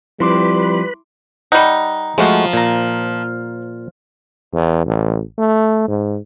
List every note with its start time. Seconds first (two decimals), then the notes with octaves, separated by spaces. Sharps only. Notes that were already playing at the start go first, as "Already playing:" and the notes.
0.20 F3 G3 C4 E4 B4 B5 C6 D6
1.52 G3 D#4 F#5
2.18 F3 G#3 A3 F#4
2.53 A#2 A#5
4.53 E2
4.86 A1
5.38 A3
5.88 G#2